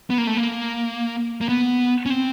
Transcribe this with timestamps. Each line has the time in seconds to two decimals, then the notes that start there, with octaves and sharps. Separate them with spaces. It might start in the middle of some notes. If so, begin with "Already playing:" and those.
0.10 B3
0.18 A#3
0.27 A3
0.37 A#3
1.41 A#3
1.49 B3
2.06 C#4
2.10 C4